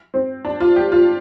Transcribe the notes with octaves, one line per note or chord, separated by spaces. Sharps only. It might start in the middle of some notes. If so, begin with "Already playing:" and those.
C4
D4
F4
G4
F4